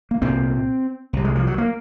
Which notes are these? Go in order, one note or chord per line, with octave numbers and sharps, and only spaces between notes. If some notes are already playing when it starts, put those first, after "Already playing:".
A#3
C2 A#2 C4
C2 C3
G#3
F3
F#3
A#3